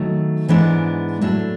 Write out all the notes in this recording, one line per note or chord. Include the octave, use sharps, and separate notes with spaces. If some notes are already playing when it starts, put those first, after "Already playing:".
Already playing: D#3 F#3 A3
G#2 E3 G#3 B3 D4
A2 F#3 A3 D4